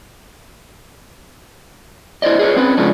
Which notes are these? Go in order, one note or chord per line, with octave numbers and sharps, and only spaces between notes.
E4 C5 D5 D#5
G#4 B4 C#5
C4 C#4 B4
C#3 F3 G#3 A3 C#4 D4